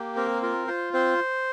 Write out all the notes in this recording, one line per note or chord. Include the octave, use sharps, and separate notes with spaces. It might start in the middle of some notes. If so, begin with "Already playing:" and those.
Already playing: A#3 G4
C4 A#4
F4 A#4
F4 C5
C4 C5